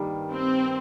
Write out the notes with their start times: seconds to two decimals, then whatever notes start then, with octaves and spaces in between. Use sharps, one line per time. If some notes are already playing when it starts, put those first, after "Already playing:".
Already playing: G2 D#3 G3 A#3
0.32 C4